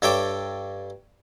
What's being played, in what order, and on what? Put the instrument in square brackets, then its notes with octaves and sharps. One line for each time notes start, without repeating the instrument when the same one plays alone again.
[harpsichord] G2 A4 C#5 E5 G5 D6